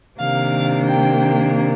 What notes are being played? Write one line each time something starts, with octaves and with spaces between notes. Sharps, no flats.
C3 D#3 A#3 D4 F5
G5